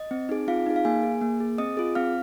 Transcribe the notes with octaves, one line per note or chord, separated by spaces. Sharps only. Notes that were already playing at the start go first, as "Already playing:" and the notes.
Already playing: D#5
C4
D#4 G#4
C4 F4 F5
D#4 G#4
F5
A#3 G#4 G#5
G#4
A#3
G#4
C4 D#5 D#6
F4 G#4
C4 F5 F6